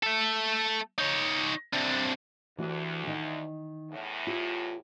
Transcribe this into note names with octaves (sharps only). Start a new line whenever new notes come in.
A3 A4
D#4 C#5
C3 D4
D2 E3 F#4 G4
D#3 D#4
E2 A2
F4 G4